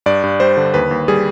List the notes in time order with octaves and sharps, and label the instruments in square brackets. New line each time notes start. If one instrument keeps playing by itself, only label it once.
[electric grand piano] G2 D5
G2
G3 C5
D3
D#2 B4
D#2
G3 G#4